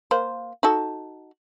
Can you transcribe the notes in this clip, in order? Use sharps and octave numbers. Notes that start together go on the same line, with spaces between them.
A#3 C5
D#4 F#4 A4